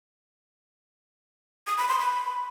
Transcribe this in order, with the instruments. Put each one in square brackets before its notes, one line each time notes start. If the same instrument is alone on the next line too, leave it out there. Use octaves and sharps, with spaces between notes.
[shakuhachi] D#6
B5
C6
B5